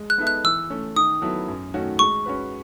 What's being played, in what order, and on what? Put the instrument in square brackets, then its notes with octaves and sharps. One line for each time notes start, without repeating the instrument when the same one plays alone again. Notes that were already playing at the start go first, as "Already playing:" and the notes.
Already playing: [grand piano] G#3
[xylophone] F#6
[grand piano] B3 D#4 A4 E5
[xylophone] F#6
[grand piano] E3 [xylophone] E6
[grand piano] A3 C#4
[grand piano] D#3 [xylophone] D#6
[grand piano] F#3 B3 E4 A4
F#2
D#3 A3 C#4 F#4
[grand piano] G#3 [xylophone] C#6
[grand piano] C#4 F#4 B4